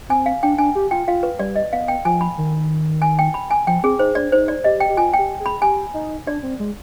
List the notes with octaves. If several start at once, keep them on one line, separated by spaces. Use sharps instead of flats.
C4 G#5
F5
D4 G5
D4 G#5
G4
F4 G5
F4 F5
B4
G3 D5
D#5
B3 F5
G5
F3 G#5
B5
D#3
G#5
G5
B5
G#5
F3 G5
C4 G#4
D#4 C5
D4 D5
D#4 C5
D5
G4 D#5
G5
G4
F4 G#5
G4 G5
G#4
B5
G4 G#5
D#4
D4 D5
C4
G#3